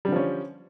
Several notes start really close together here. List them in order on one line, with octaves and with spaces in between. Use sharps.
G3 D3 F3 C#4